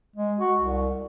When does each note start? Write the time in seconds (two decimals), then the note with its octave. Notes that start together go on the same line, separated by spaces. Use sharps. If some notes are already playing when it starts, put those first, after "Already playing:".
0.16 G#3
0.39 F#4
0.60 C2